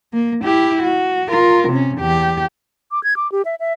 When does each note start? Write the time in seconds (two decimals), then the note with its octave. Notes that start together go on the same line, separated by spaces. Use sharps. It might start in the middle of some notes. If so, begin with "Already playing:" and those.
0.14 A#3
0.44 E4 G4
0.83 F#4
1.29 F4 A#4
1.68 C3 C#4
1.98 E2 G4
2.91 D6
3.04 G#6
3.16 D6
3.32 G4
3.45 E5
3.60 E5